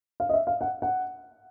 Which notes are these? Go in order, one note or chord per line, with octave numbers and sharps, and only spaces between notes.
F5
D#5
E5
F5
F#5
F#5